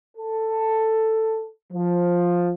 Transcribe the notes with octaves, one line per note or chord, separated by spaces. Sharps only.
A4
F3